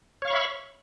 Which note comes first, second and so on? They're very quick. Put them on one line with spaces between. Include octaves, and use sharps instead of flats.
C#5 F5 C#6 B5 E5